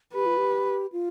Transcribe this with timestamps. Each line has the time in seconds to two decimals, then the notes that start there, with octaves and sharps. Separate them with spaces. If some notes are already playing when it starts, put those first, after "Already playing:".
0.14 G4 B4
0.26 F4
0.37 G4
0.92 F4